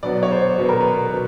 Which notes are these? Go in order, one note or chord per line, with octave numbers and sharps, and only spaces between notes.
B2 F#3 B3 D5
C#5
C5
B2 F#3 B3 B4
A#4
B4
B2